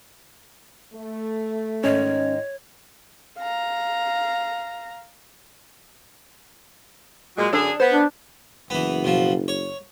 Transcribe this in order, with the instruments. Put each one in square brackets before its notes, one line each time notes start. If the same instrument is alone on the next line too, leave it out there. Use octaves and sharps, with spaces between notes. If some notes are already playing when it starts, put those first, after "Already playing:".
[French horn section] A3
[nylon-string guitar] G#2 D#3 [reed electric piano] C#4 [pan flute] C#5
[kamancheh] F5 A#5
[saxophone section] A#2 F#3 G#3
[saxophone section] F#2 D3 G#4 [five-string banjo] D4 A4 D5
[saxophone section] B3 [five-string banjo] C5
[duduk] D4
[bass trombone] F#1 [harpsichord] E3 B3
[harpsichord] B2 F3
C#5